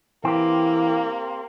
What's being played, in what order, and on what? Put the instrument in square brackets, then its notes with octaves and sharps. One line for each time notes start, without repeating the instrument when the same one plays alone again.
[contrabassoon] E3 [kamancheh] A#3 [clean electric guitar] C4 G4